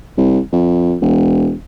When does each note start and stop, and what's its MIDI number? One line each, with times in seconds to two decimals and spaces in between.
0.18 0.39 36
0.53 0.96 41
1.02 1.54 28